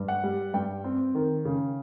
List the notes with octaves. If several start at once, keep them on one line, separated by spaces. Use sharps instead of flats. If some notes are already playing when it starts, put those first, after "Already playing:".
Already playing: G2
F#5
G3
G2 G5
C4
D#3
C#3